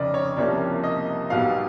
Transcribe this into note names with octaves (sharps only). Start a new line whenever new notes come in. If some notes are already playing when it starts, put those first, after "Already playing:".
Already playing: F1 F2 C#3 D5 D#5
C#5
C2 C3 F3 A#3 C#4 D5
D#5
B1 B2 G3 B3 F5